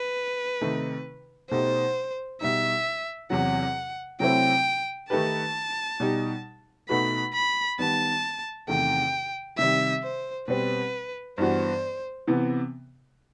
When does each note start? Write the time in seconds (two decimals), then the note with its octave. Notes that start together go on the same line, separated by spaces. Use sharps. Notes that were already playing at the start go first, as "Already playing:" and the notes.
Already playing: B4
0.61 C3 D#3 A3 D#4
1.50 B2 A3 D#4 G4 C5
2.41 B2 G3 D#4 E5
3.30 E2 C3 F#3 F#5
4.20 C3 F#3 A3 C4 E4 G5
5.10 D#3 A3 D#4 G4 B4 A5
6.00 B2 G3 D#4 G4
6.89 B2 A3 D#4 F#4 B4 B5
7.34 B5
7.79 D#3 G3 B3 A5
8.68 E2 C3 D#3 A3 G5
9.58 C3 D#3 G3 E5
10.02 C5
10.48 B2 G3 C4 B4
11.38 G2 E3 B3 F#4 C5
12.27 C3 E3 B3